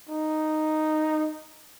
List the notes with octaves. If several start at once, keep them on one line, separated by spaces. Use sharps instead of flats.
D#4